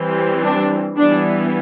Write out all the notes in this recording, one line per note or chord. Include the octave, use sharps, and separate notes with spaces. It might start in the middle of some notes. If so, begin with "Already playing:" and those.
Already playing: E3 G3 C4
D4
E3 G3 B3 D4